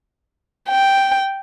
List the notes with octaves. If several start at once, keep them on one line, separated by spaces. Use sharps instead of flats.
G5